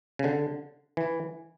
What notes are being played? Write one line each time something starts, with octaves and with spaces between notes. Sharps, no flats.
C#3
D3
E3